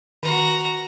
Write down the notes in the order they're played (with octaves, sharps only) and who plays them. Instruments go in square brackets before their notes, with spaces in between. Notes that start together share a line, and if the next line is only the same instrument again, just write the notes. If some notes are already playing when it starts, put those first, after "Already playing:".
[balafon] D#3 [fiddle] F#4 A#5